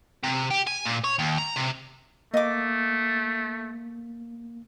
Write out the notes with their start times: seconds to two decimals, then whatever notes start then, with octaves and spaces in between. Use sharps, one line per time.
0.24 C3
0.50 G4
0.67 G#5
0.85 A#2
1.04 C#5
1.19 D#2
1.38 A#5
1.56 C3
2.34 A3 A#3 D#5 D6